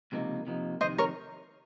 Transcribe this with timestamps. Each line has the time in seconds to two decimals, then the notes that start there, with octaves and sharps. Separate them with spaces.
0.12 C#2 C3 F3 A#3 D#4
0.47 C3 F3 A#3 D#4
0.81 F2 C3 D#3 C5 D#5
0.98 A#4 C#5